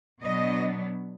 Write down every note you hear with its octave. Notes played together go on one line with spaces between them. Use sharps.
B2 F#3 B3 D4 D#5